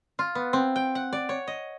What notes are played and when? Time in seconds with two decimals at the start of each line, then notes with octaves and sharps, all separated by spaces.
0.19 F4
0.35 B3
0.53 C4
0.76 G5
0.95 F#5
1.13 D5
1.29 C#5
1.47 D#5